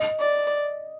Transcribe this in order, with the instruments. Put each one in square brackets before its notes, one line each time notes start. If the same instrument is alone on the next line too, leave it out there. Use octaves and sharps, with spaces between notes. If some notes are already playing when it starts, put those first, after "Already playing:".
Already playing: [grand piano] D#5
[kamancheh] D5